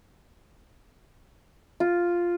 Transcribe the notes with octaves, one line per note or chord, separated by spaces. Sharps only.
F4